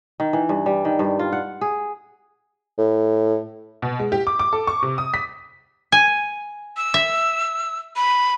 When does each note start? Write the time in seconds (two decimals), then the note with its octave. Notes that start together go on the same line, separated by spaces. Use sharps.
0.20 D#3
0.33 E3
0.49 G2
0.66 G3
0.85 D#3
0.99 G2
1.19 F4
1.32 F#5
1.61 G#4
2.78 A2
3.82 B2
3.99 G#3
4.12 G4
4.27 D6
4.39 D6
4.53 A4
4.67 C#6
4.83 C3
4.98 D#6
5.14 B6
5.92 G#5
6.77 E6
6.94 E5
7.96 B5